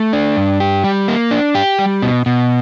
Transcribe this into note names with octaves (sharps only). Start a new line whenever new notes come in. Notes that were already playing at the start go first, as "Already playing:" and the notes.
Already playing: A3
D4
G2
G4
G3
A#3
D4
G4
G3
B2
B2